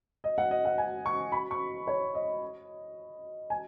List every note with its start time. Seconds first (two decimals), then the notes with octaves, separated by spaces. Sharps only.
0.24 D#5
0.38 F#5
0.51 D#5
0.65 F#5
0.78 G#5
1.06 C#6
1.32 B5
1.51 C#6
1.87 C#5
2.15 D#5
3.50 G#5